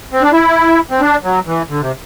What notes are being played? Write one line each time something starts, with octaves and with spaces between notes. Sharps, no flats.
C4
D4
E4
C4
D4
F#3
E3
D3
C3